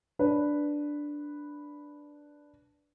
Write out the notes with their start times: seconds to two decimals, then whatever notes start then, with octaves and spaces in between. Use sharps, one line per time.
0.19 D4 B4